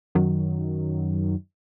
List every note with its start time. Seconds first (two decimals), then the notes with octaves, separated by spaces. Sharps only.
0.15 F#2 D#3 F#3